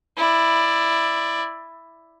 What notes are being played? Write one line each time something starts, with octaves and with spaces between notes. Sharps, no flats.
E4 D5